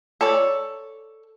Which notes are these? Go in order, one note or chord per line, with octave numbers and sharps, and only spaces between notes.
A4 C#5 D5